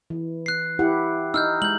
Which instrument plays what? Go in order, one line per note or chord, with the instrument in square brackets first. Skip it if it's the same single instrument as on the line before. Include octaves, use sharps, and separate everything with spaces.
[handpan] E3
[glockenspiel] F#6 C7
[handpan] E4 G4 F#5
[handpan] D#4 [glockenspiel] E6 F6 G6
[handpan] G#3 [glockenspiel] G6 F#7